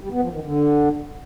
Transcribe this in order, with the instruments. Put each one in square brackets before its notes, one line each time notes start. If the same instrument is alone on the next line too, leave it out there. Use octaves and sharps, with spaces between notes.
[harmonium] G3
B3
F3
D#3
D3